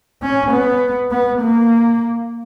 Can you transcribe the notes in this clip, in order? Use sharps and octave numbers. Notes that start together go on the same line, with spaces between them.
C#4
B3
B3
A#3